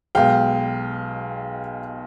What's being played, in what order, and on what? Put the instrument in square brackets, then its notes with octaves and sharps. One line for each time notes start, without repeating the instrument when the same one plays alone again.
[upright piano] B1 B2 G#3 F5 G5